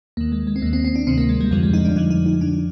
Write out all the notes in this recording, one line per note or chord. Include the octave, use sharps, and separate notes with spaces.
D#2 D#3 A#3
G#3
G#3
C4
D#2 D#3 A#3
C4
C4
D4
D2 C3 D#3 C4
A#3
G#3
G3
F2 D3 F3 G3
G#3
D#4
D4
F2 D3 F3 D#4
D#4
D#4
F2 D3 F3 D4